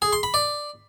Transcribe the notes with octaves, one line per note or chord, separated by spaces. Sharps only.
G#4
C6
B5
D5